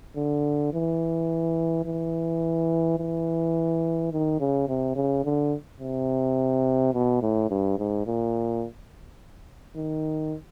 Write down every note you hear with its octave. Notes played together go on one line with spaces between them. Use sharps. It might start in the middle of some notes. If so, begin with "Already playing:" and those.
D3
E3
E3
E3
D#3
C#3
C3
C#3
D3
C3
B2
A2
G2
G#2
A#2
D#3